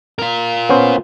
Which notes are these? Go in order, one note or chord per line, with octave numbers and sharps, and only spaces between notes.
F4 A#4
B3 C#4 C5